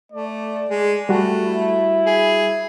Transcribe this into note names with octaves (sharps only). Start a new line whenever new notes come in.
A3 D5
G#3
G3 A3 F#4
E4
G#4